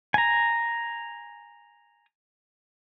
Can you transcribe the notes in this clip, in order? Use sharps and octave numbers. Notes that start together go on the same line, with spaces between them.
G#5 A#5